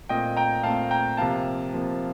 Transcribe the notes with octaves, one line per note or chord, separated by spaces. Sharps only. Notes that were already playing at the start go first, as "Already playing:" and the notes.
A#2 A3 C4 D#5 G5
G5 A#5
A#2 A3 C4 F5 A5
G5 A#5
C3 F3 A#3 F5 A5
C3 F3 A#3